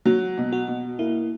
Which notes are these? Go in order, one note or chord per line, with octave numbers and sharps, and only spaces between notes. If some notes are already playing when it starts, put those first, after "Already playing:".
F#3 F#4
B2
F#4
B2
A#3 E4